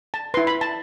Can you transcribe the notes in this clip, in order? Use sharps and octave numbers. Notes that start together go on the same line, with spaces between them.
A5
E4 B4 C6
B5
A5